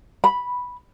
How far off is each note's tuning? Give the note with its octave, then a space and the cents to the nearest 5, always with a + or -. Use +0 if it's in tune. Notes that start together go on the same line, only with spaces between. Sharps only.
B5 -5